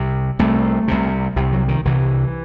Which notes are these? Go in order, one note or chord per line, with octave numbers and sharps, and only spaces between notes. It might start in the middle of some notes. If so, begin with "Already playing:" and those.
Already playing: C2 C3
C2 C3 A3
C2 C3
C2 C3
F#3
D#3
C2 C3 E3